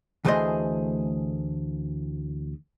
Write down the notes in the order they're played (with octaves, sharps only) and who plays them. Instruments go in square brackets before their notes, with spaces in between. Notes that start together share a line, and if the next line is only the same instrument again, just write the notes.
[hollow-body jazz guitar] D2 E3 A3 G#4 C5 D#5